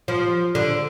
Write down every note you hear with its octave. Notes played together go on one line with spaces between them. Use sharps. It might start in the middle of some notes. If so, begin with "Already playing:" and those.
F3
D3